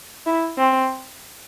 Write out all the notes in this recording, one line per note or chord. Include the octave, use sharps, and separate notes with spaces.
E4
C4